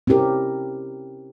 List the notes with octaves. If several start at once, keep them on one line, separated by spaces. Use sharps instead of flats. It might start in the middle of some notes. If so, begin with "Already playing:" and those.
C4 C#4 E4 G4 A#4